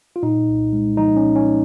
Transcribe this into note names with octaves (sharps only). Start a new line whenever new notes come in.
F4
A#2 D#4
C2
G#3
F3 D#4
C#4
A#2
C#4